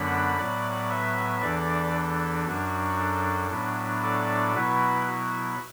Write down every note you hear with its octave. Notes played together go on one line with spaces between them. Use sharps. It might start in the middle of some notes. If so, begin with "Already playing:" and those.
Already playing: F#2 D3 F#3 B3 D4 F#5 B5
A2 F#3 B3 D5 F#5
B4 E5
E2 E3 D4 A4 D5
A4
F#2 F#3 D4 F#4
A4
A2 F#3 B3 D4
A4 D5
B2 F#3 B3 E4 F#4 B4
F#4